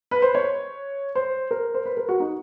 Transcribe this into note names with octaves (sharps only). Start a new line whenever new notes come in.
B4
C5
C#5
C5
A#4
C5
B4
A#4
F#4
D#4